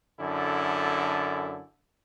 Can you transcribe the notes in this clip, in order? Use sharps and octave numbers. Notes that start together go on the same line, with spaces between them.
F#2 D3 E4 A4